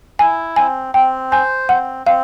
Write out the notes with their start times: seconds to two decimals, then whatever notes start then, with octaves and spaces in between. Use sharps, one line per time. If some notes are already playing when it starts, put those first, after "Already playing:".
0.19 E4 G#5
0.56 C4 G#5
0.94 C4 G5
1.31 C5 G#5
1.69 C4 F#5
2.07 C4 F5